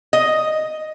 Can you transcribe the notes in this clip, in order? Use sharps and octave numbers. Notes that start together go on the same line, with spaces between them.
D#5